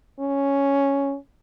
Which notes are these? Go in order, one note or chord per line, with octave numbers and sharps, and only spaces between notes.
C#4